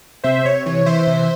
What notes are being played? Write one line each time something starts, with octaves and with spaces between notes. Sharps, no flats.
C3 C5 E5
C3 C#5
E3 C#5
E3 C5 E5
C3